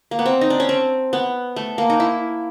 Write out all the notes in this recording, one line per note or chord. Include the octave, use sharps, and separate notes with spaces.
A#3
B3
C4
D#4
D4
C#4
C4
B3
A3
A#3
D#4
E4